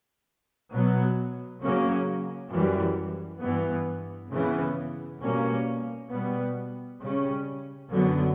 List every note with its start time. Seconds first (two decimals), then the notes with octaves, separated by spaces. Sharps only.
0.71 B2 F#3 B3
1.60 C#3 F#3 A#3 C#4
2.51 F#2 E3 G3
3.41 G2 E3 B3
4.30 C#3 E3 B3
5.20 B2 G3 A#3 C#4
6.10 B2 G3 B3
7.00 C#3 G3 C#4
7.90 F#2 D3 F#3 B3